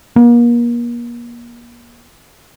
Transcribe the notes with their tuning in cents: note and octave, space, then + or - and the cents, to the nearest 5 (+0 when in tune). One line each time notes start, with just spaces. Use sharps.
A#3 +35